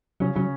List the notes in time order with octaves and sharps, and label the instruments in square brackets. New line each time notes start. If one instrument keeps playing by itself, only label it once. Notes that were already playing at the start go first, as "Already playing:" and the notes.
[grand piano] C#3 C#4 [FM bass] F#3
[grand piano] C#3 C#4 [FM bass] F#3